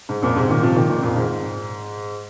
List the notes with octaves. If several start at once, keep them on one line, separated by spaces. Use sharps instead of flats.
G#2
F2 A#2
G#2 C3
A#2 D#3
C3 F3
A#2 D#3
A#2 D#3
F2 A#2
G#2